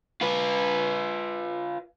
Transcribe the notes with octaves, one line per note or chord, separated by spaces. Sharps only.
F4 B4